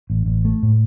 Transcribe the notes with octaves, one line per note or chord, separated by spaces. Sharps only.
A1
A1
A3
A2